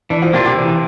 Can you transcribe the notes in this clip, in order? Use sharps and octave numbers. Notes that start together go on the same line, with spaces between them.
E3 D4
F3
C3 A#3 D4 F4
C3
E3